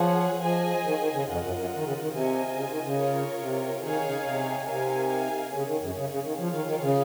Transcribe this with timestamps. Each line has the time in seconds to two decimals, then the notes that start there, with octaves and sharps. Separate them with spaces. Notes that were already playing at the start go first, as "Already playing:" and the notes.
Already playing: F3 G#4 C#5 F#5
0.42 F3 G#4 C5 D#5 G#5
0.85 D#3
0.99 D#3
1.13 C#3
1.27 F2 F4 A#4 D#5 F#5
1.42 F#2
1.56 F#2
1.75 D#3
1.84 C#3
1.99 D#3
2.12 C3 F4 C5 D#5 G#5
2.54 C#3
2.69 D#3
2.84 C#3
2.97 F4 A#4 C#5
3.41 C3
3.82 D#3 D#4 G#4 C#5 F5 G#5
4.03 C#3
4.25 C3
4.67 C3 D#4 A#4 F5 G#5
5.52 C#3 A#3 C#4 G#4 C#5
5.67 D#3
5.81 F#2
5.95 C#3
6.10 C#3
6.23 D#3
6.38 F3 F4 G#4 C#5 F5
6.52 D#3
6.66 D#3
6.81 C#3